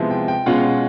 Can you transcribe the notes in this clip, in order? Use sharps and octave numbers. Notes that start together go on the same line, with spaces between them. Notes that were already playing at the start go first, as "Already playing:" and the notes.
Already playing: C3 F3 G#3 B3 E4
G5
G5
B2 G#3 C#4 F4 F#5